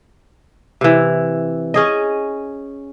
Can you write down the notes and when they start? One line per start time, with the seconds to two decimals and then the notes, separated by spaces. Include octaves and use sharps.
0.81 C3 E3
1.74 C#4 G#4 D#5